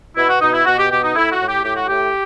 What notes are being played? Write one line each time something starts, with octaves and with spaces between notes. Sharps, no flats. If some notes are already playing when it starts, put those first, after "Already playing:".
B2 E4
F#4
B2 D#4
E4
B2 F#4
G4
B2 G4
D#4
A2 E4
F#4
A2
G4
A2 G4
F#4
A2 G4